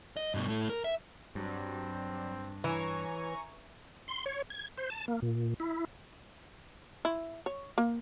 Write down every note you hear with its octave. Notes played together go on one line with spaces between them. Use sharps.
D#5
G2 B2
A2 A3
A#4
E5
G2 F#3 G3 C4
E3 C#5 G#5 A#5 C#6
C6
C#5
G#6
C5
A5
A#3
A#2
E4
E4
C#5
A#3